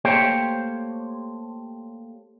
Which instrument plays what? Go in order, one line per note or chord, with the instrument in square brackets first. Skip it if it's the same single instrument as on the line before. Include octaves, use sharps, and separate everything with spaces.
[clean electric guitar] A3 A#3 G4 C5 C#5 G5